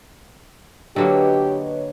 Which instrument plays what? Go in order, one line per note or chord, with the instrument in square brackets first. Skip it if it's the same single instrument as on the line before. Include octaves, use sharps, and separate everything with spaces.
[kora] D3 F#3 A#3 [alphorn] G4 [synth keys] B4 C#5 D#5